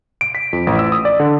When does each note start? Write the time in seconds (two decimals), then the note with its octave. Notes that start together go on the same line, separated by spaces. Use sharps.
0.21 D7
0.35 B6
0.53 F2
0.67 A1
0.79 E6
0.92 D#6
1.05 D5
1.20 D3